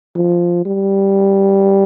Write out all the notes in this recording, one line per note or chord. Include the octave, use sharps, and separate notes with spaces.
F3
G3